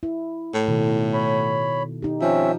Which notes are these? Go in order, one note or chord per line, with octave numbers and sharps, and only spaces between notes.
E4
A2
B2 D#3 A4
C#5 B5
D#4 G4
F3 C4 C#4 E5